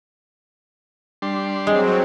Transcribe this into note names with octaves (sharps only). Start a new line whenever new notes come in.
G3 D4 C6
F#3 G#3 C4